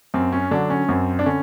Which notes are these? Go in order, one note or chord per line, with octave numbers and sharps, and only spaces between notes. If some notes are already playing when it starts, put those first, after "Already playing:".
F#2 C4
C#4
D3 F#3 D4
C#4
F#2 C4
D4
D3 C#4